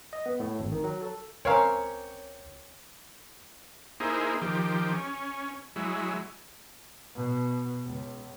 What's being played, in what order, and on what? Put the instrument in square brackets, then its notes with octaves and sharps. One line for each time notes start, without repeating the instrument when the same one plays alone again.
[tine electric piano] D#5
B3
A2
G#1
D#3
F#3
A4
[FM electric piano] C#2 [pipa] C4 C#4 G4 [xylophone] A#4 A#5 [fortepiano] C#5 F5
[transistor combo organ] A#3 D#4 E4 G#4 C5
D#3 F3 G4
C#4
F#3 G#3 E4
[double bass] B2
C#2